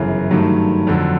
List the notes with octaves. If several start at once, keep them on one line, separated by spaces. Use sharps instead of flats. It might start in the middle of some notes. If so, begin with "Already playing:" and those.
Already playing: G1 F#2 C#3 E3
G2 D#3 F#3 A3
F2 D3 F#3